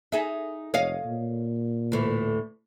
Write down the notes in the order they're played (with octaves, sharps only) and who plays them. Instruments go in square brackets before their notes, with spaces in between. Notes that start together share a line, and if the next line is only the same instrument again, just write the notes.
[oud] D#4 G#4 E5
[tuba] F1 [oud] C#5 D#5 F5
[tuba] A#2
[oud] D2 A2 E3